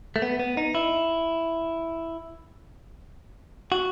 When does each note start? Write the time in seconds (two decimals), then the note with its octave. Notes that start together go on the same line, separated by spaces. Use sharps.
0.16 A3
0.22 B3
0.39 B3
0.57 D#4
0.75 E4
3.72 F#4